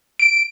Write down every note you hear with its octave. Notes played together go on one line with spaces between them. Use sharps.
D7